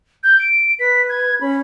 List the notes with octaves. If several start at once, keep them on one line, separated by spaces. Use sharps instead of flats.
G6
D7
B4 B6
G#6
C#4 B5